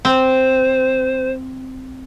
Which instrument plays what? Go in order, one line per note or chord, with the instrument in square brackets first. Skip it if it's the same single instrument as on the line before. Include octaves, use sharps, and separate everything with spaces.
[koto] C4 [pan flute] C5